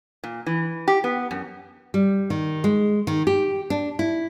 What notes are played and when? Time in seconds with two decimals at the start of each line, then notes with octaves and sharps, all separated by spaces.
0.24 A#2
0.46 E3
0.88 G4
1.04 B3
1.31 F#2
1.94 G3
2.30 D#3
2.64 G#3
3.07 D#3
3.27 G4
3.70 D4
3.99 E4